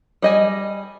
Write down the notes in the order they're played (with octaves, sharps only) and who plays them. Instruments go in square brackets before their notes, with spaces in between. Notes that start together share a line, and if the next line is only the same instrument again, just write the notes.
[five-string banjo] G3 D#5 G#5